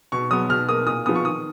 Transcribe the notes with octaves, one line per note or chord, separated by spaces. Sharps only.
B2 C#6
F#3 B3 D#6
B2 F6
A#3 D#6
A#2 D#6
F3 B3 D#6
C#6
D#3 D#6